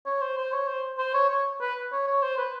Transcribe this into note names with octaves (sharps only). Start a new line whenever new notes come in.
C#5
C5
C5
C#5
C5
C5
C#5
C#5
B4
C#5
C#5
C5
B4